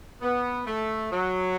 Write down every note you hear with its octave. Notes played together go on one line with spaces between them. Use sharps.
B3
A3
F#3